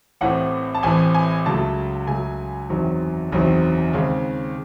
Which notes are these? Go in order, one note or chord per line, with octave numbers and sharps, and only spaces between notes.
A1 A2 E3 C4 F#5
A5
A1 A2 E3 C4 G#5
G#5
C#2 C#3 F#3 A3 A5
C#2 C#3 F#3 A3 G#5
F#1 E2 D#3 F#3 C4
F#1 E2 D#3 F#3 C4
D#2 C#3 G#3 C4